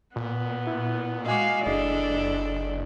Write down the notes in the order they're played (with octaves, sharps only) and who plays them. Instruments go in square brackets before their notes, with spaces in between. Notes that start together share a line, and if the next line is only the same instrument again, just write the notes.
[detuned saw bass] A#2 [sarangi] B3
[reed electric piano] E4
[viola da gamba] G#3 F#4 [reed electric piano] D#5 G#5 D6 [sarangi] F5
[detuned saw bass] F#1 [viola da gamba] D4 E4 A4 [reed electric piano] G#4 D#5 [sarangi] D5